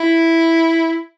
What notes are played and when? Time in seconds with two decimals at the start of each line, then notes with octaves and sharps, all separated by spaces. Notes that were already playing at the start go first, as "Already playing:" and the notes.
Already playing: E4